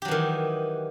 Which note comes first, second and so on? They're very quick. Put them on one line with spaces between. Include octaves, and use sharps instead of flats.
G4 F#3 E3 D#3